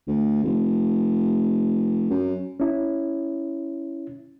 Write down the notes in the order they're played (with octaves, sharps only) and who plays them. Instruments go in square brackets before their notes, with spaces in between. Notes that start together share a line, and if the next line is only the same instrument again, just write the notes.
[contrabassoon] D2
F1
F#2
[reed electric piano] C#4 E4